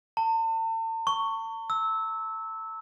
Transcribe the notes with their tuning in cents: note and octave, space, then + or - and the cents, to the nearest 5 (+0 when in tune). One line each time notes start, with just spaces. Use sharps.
A5 +40
C#6 +5
E6 -15